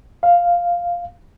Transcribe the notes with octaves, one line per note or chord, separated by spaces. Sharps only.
F5